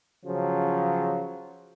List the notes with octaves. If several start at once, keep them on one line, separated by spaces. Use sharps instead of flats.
C#3 F3 F#3